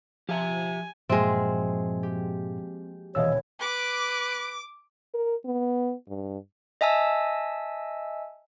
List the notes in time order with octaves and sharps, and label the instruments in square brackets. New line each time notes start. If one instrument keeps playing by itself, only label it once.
[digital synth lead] F3 [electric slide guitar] G4 E5 [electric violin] G#5
[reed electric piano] G2 A#2 E5 [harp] F3 A#3 F#4 [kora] G#3 C4
[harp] G4
[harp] D#1 B2 E3 [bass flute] C#5 [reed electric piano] D#5 F5 E6
[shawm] B4 [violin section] D6
[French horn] A#4
B3
G2
[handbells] D#5 E5 G#5 A5 E6